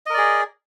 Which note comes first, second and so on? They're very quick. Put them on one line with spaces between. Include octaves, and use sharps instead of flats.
D#5 A#4 D5 G#4